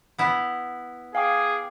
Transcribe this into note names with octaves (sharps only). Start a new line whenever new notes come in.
B3 E4
G#4 F5 G5 D6